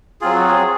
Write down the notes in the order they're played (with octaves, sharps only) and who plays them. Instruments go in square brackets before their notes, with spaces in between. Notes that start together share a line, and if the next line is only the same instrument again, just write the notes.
[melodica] F#3 C4 F4 G#4
F#4
G#4